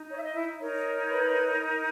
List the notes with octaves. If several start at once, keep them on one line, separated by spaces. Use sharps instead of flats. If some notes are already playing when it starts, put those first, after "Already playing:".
Already playing: D#4
C#5
E5
D#5
E4 E5
D#4 A#4 C#5
B4 B5